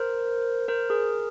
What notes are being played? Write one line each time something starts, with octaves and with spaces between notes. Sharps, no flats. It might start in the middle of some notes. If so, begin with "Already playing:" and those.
Already playing: A#4 C5
A#4 C5
G#4 A#4